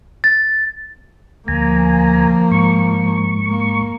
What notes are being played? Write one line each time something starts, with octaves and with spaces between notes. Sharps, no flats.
A6
D2 F3 A#3 G#5 A#5
G#2 C#6
A#3